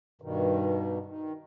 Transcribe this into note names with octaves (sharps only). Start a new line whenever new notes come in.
G2 B2 D#3
D#3